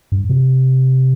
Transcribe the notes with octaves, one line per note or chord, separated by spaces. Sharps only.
G2
C3